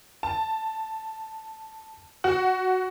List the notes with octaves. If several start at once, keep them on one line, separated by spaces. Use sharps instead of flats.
A5
F#4